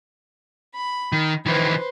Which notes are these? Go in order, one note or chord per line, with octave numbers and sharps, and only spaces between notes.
B5
D#3
D#3 E3 B4 C5